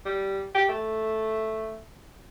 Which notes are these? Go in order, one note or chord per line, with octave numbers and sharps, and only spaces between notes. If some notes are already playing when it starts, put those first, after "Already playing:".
G3
G4
A3